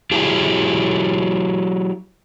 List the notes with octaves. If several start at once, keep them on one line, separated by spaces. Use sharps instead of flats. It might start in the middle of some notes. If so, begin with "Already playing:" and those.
F#3 E4 G4 G#4 F5 A5